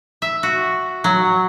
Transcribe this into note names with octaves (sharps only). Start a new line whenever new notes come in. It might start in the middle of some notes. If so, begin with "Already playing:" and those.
E5
F#4
F#3